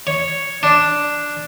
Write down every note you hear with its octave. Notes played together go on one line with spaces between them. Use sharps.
C#5
D4